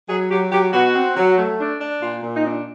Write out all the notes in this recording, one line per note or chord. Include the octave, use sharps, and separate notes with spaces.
F#3 G#4
F#3 G4
F#3 G4
B2 F#4
C4
F#3
A3
D4
D4
A#2 F4
A#2
D#4
D4